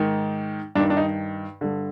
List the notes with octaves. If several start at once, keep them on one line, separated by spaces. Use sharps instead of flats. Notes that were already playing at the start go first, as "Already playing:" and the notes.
Already playing: G#2 D#3
G2 D#3 D4
D4
D#4
G2 D3